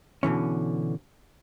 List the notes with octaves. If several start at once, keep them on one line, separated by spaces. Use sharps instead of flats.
B2 D3 E3 C#4